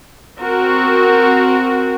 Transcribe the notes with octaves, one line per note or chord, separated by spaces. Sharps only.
C4 F#4 A#4